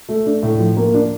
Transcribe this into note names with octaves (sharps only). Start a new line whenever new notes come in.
A3
D4
A2
F3
A#3
D4